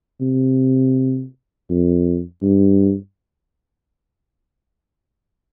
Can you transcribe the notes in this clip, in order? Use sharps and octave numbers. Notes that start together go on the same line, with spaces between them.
C3
F2
G2